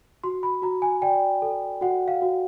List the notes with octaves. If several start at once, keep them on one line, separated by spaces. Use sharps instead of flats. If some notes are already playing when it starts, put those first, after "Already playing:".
F#4 C6
B5
F#4 A#5
G#5
D5 G5
A4
F#4 F#5
F5
F#4